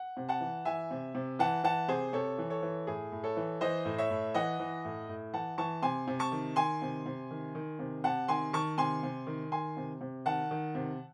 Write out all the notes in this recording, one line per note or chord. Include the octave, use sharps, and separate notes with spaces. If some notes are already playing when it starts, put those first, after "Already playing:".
Already playing: F#5
C3
F#5 A5
E3
E3 E5 G#5
C3
C3
E3 F#5 A5
E3 F#5 A5
C3 G#4 C5
C3 A4 C#5
E3
A4 C#5
E3
A2 G#4
A2
A4 C#5
E3
E3 C5 D#5
A2
C#5 E5
A2
E3 D#5 F#5
E3
A2
A2
E3 F#5 A5
E3 A5 C#6
C3 G#5 C6
C3
A5 C#6
D#3
D#3 G#5 C6
C3
C3
D#3
D#3
C3
C3 F#5 A5
D#3 G#5 C6
D#3 A5 C#6
C3 G#5 C6
C3
D#3
D#3 G#5 C6
C3
C3
D#3 F#5 A5
D#3
C3